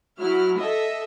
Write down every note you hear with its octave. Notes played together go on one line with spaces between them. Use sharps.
F#3 E4 F6
A4 D#5 E5